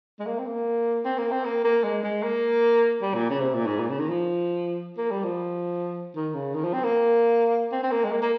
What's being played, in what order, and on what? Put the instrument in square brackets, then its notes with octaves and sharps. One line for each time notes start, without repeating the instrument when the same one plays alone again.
[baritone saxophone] G#3
A#3
C4
A#3
C4
A#3
C4
A#3
A#3
G#3
G#3
A#3
G3
A#2
C#3
C3
A#2
G#2
A#2
C#3
D#3
F3
A#3
G3
F3
D#3
C#3
D#3
F3
C4
A#3
C4
C4
A#3
G#3
A#3
A#3